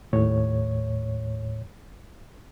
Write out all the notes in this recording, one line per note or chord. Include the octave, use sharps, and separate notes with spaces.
D#2 A2 C#5